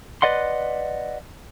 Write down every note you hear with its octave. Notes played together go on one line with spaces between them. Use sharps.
B4 D5 D#5 F#5 C6